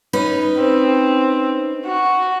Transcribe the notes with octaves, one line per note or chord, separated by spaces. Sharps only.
C#4 D#4 B4
C4
F#4